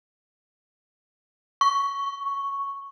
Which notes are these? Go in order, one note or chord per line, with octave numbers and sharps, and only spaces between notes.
C#6